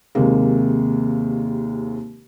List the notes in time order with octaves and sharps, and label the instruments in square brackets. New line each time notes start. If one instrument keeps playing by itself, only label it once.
[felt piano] D#2 C3 G#3 A#3